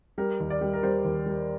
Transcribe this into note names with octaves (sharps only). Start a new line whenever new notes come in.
G3 A#4
D#2
D5
G3
A#4
G3 C5
D#2
G3